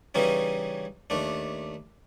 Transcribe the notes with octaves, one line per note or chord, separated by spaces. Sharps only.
C#3 E3 G3 C#4 D#4
D#2 A3 D4